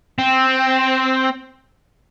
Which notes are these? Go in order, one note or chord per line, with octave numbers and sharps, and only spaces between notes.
C4